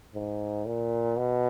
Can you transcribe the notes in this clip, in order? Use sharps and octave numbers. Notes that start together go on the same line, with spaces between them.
G#2
A#2
B2